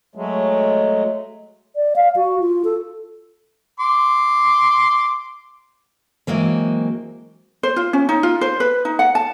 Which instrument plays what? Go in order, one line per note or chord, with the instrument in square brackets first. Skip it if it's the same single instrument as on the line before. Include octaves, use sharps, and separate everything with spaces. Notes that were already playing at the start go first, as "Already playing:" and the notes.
[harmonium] F#3 G#3 A3
[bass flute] D5
F5
F#4
F4
A4
[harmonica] C6 D6
[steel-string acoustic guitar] E3 F#3 G#3 A#3 C4
[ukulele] C5
F4
C#4
D#4
F4
C5
B4
D#4
F#5
A5